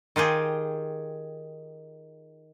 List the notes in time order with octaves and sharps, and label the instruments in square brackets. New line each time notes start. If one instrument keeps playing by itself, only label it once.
[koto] D#3 F4 G4 G#4